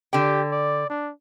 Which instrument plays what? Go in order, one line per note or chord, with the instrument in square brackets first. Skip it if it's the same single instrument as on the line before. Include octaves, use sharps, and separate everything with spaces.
[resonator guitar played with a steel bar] D3 G5 [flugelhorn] G4
[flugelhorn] D5
D4